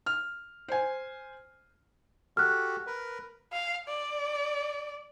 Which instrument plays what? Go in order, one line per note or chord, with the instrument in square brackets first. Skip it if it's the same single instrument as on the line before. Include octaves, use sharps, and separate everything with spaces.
[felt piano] F6
C5 G#5
[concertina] F#4 G4 A4 [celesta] F6 F#6
[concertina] A#4 B4
[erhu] F5
D5